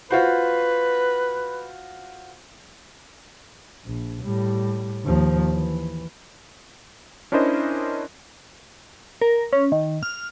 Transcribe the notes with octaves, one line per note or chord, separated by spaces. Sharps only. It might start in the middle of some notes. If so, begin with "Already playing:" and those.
F4 F#4 B4 C5
A#1
A2 G3
D#2 F3
E3
C#4 D4 E4 A#4 C5 D#5
A#4
C#4
D#3
F6